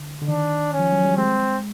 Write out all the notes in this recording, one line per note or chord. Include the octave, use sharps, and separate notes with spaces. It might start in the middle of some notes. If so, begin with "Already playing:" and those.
Already playing: D3
D3
D#3 D4
C#4
F3
F#3
G3
G#3 C4